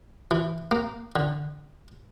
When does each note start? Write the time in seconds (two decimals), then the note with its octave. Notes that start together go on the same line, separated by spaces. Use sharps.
0.31 E3
0.71 A#3
1.16 D3